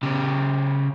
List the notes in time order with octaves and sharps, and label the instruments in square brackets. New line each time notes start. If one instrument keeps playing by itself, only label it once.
[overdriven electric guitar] C#3 G4